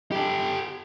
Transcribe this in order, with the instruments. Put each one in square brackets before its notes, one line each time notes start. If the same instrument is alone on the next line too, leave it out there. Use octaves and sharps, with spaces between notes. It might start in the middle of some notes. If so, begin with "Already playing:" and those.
[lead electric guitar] G4 A4